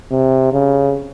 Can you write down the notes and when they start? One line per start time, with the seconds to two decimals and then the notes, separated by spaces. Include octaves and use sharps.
0.11 C3
0.53 C#3